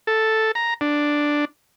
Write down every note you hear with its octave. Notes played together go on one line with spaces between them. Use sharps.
A4
A#5
D4